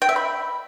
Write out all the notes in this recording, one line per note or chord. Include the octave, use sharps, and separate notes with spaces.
G5
E5
B5